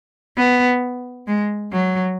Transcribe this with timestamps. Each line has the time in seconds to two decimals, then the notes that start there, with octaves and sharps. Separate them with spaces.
0.37 B3
1.27 G#3
1.72 F#3